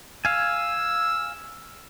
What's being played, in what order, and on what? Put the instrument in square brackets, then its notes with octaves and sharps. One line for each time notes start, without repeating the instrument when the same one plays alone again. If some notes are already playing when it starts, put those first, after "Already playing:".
[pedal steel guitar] F5 G#5 [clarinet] E6